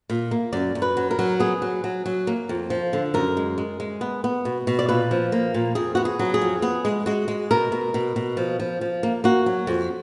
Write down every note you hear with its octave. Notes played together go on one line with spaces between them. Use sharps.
A#2
A#3
F#2 D5
F#2
B4
F#3
A#4
F#3
B3 G#4
F#3
F#3
F#3
A#3
F2
F3
D3
F#2 A#4
G#3
G#3
G#3
B3
B3
B2
B2
D5
A#2 B4
F3
A#3
A#2
F2 G#4
B3 F#4
G#4
F#3
G#4
F2
B3 G#4
G#3
G#3 F#4
G#3
B2 A#4
B2
B2
B2
F3
F3
F3
A#3
A#3 F#4
F#3
F2